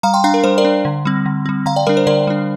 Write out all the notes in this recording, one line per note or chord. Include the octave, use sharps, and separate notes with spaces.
G3 F5 A#5
G5 C6
D4 F5 A#5
A#4
G3 C5
A#4 D5
D4
D3
G3 C4
D3
G3 C4
D3 F5 A#5
D5 G5
G3 D4 A#4 D5
C5
D3 A#4 D5
G3 D4